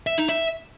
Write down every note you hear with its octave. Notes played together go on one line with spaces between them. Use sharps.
E5
D#4
E5